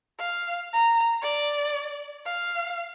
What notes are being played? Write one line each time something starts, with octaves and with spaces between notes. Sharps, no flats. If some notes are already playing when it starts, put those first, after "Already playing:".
F5
A#5
D5
F5